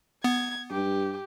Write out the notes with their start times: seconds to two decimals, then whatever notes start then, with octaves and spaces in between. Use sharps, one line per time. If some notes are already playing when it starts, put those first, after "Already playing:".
0.24 B3 G#6
0.71 G2 G4